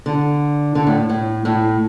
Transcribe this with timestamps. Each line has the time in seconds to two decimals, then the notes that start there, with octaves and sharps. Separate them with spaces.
0.06 D3
0.75 D3
0.87 A2
1.09 A2
1.45 A2